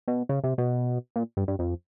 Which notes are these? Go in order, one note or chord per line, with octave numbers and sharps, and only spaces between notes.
B2
C#3
C3
B2
A#2
G2
G2
F2